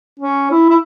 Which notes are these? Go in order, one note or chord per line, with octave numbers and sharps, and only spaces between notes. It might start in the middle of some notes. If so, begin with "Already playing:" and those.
C#4
E4
E4